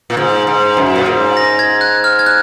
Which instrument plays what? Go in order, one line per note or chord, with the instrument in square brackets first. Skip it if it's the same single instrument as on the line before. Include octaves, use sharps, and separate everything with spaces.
[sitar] A#2
G#2
G#2
F#2
A#2
G#2
[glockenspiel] A#6
G#6
F#6
F6
G#6
F#6